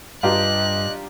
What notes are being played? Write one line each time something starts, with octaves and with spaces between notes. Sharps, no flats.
G2 F4 G4 D#5 A#5 F#6